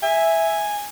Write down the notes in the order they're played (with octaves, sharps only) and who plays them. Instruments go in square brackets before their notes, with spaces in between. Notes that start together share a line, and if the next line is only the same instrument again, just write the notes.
[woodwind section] E5 [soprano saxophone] G#5